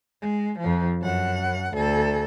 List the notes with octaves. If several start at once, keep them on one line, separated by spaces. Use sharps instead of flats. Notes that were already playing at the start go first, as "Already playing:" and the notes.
G#3
F2 F3
F#2 F#5
D2 A4